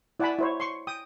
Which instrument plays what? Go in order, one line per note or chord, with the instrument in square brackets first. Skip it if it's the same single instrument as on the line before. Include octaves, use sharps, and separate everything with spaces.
[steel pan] E4 D5 F#5 G#5 A5 B5
E4 C5 C#5
C6 C#6
G5 D#6